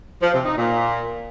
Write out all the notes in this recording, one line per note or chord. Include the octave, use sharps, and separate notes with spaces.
F3
C3
D#4
A#2